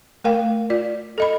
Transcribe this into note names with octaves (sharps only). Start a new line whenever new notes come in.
A3 A#4 F5 G5
F4 D5
A4 D#5 B5